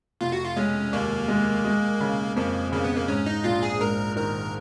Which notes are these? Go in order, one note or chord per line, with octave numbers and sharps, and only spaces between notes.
F1 F4
F#4
F4
G#3 C#4
D#2 A#3
G#3
G#3
C#3
F2 A#3
C#3 A#3
B3
A#3
G#2 C#4
D#4
A#1 F4
G#4
G#2 A#4
D#3 A#4